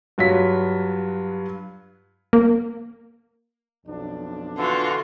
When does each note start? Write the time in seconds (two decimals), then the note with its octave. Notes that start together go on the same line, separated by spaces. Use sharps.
0.18 G2 F#3 F4 B6
2.33 A#3
3.86 B1 F2 D4
4.58 D3 E3 F4 F#4